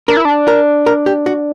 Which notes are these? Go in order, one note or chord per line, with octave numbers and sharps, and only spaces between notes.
D4 A#4
E4
D4
A#4
A#4
G4
F#4